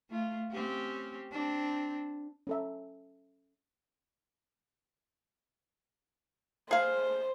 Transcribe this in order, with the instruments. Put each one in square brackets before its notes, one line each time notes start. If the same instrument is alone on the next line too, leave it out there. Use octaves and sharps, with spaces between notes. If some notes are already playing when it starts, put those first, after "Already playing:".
[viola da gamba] A3 F4
C4 C#4 G4
C4 D4
[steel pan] C#4 A4 E5
[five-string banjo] G#4 F5 [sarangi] C5